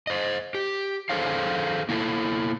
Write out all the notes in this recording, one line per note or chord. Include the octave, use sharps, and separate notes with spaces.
C5 D#5
G4
G#4 A4 C5 C#5 F5
A#3 E4 A4